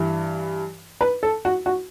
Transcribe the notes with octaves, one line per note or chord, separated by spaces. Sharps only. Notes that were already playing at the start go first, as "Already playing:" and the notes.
Already playing: G2 E3
B4
A4
F#4
F#4